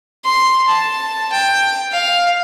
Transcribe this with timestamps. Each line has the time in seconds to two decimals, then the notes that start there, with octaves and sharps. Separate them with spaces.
0.25 C6
0.68 A5
1.32 G5
1.92 F5